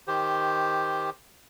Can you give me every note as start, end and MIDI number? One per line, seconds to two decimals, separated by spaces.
0.07 1.10 51
0.07 1.10 67
0.07 1.10 72